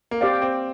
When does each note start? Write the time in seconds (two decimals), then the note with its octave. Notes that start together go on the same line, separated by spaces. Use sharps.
0.11 A#3
0.21 C4 G4 D5 F5
0.42 C4